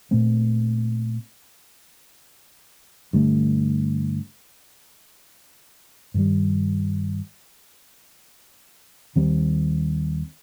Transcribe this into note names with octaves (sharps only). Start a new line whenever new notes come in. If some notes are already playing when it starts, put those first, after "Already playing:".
A#2 A3 C4
G2 D3 A3
G2 D#3 G3
D#2 D#3 G3 C4